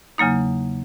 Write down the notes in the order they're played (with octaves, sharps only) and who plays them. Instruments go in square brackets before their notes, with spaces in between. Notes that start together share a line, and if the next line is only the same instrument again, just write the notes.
[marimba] E2 C#3 F#3 A#3 D#4